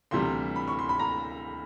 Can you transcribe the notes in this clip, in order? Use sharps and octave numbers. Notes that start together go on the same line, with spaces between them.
D2 C3 E3 G3 C6
B5
C#6
C6
B5
A#5